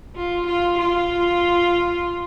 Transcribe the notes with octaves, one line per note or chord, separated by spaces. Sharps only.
F4
F4
F4